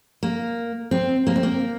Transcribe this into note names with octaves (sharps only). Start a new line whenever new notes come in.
A#3
C4
A#3
C4
A#3